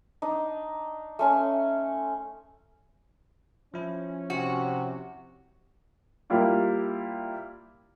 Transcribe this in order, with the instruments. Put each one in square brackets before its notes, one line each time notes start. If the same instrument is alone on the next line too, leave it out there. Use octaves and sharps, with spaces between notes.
[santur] D4 D#4
A3 C#4 C6
[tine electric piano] F3 E4 [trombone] C#4
[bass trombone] C3 [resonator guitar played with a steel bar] F#4
[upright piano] G3 A#3 E4 F4 G4